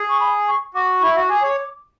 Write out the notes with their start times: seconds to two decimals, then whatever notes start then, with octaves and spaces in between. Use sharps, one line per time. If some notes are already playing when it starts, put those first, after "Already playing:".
Already playing: G#4
0.10 C#6
0.20 B5
0.48 C#6
0.74 F#4 D6
1.01 E4 C#6
1.15 F#4
1.28 G#4 D6
1.42 C#5